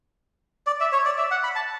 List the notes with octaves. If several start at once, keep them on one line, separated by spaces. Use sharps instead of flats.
D5
E5
C#5
D5
E5
F#5
B5
A5